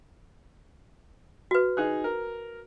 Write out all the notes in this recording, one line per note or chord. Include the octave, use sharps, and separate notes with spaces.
F#4 B4
D#4 G#4 F#6
A#4